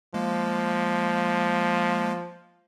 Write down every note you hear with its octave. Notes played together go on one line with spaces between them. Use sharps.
F3 G#3 A#3